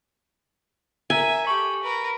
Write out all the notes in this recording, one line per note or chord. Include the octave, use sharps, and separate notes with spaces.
A#4 E5 G#5 A#5 E6
G4 A4 C#6 F#7
A#4 B4